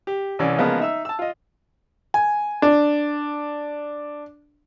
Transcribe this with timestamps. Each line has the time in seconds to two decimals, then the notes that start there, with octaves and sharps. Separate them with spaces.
0.07 G4
0.39 C2 E3 C#4 D5
0.58 C#3 F3 G#3 A#3 B3
0.79 D#4 E5 E6
1.05 A5 E6
1.19 F4 D#5
2.14 G#5
2.62 D4